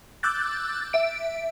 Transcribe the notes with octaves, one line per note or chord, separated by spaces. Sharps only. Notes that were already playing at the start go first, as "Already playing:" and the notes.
D6 E6 F#6 G6 A6
E5 D7